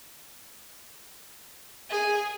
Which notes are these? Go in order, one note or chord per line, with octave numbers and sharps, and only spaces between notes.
G#4